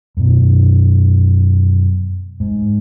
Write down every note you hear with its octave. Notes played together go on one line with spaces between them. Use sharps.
F#2 B2
G#2